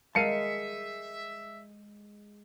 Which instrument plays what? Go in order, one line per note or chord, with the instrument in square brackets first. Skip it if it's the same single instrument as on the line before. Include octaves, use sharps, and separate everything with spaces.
[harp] G#3 [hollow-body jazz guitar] A#4 F5 A5 [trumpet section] E5 [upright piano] C7 C#7 D#7